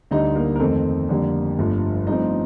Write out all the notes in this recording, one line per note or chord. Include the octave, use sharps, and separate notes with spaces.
D2 D3 G3 D#4 D#5
A#3 A#4
A#4
F2 D#3 A3 C4 A4
F2 D3 G3 A#3
G1 G2 F3 A3
G2 F3 A3 C4 D#4 D#5